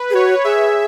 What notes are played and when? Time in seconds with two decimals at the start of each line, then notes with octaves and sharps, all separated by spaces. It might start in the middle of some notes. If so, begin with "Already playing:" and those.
Already playing: B4
0.10 G#4
0.14 F#4 C#5
0.44 G#4 E5